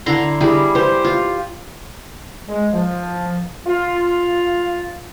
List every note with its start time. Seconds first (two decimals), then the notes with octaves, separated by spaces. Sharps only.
0.06 D3 E4 A#5 C6
0.41 G3 E4 G#4
0.75 G4 C5
1.04 F4
2.47 G#3
2.73 F3
3.66 F4